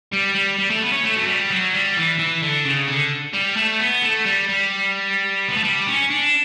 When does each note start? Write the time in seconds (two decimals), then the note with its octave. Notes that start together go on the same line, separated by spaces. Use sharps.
0.13 G3
0.35 G3
0.59 G3
0.70 A3
0.82 B3
0.92 C#4
1.04 A3
1.16 F#3
1.28 G3
1.50 F#3
1.73 G3
1.97 E3
2.19 E3
2.43 D3
2.65 C#3
2.88 D3
3.34 G3
3.57 A3
3.80 B3
4.03 A3
4.26 G3
4.49 G3
5.48 B3
5.56 A3
5.64 G3
5.87 C#4
6.10 D4